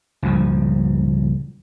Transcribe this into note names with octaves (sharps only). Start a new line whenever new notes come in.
C#2 G2 A#2 F3